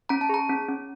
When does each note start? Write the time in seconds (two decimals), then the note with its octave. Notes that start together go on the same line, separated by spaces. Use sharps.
0.09 C#4 A#5
0.21 A5
0.29 G#4 A#5
0.49 C#4
0.69 C#4